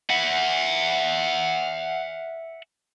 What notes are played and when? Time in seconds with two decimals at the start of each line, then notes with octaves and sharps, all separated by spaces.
0.10 E5 F#5